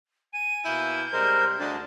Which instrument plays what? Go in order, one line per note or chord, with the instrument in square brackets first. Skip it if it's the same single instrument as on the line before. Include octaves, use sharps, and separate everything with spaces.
[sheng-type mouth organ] G#5 [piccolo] D#7
[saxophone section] B2 A#3 E4 [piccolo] G6
[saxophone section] C3 G3 G#3 [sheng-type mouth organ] A#4 C5
[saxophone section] D2 G#3 [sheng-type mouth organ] D4 A5